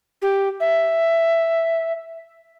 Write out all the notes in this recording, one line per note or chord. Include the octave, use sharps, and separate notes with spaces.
G4
E5